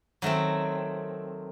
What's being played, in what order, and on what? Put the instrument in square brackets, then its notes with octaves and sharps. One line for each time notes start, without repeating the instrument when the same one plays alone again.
[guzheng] D#3 F#3 A3 C4